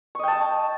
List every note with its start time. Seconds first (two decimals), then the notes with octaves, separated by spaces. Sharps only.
0.15 C#6
0.19 D#5
0.23 G5
0.28 A5